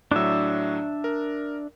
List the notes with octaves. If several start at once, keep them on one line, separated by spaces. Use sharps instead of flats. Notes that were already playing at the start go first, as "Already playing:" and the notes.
A2 F#3 D4 E5
A#4